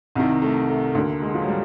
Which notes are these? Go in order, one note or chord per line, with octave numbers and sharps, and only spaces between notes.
C2 C3 D#3
A3
A3
D2 D3 A#3
G#3
F3
F#3
G3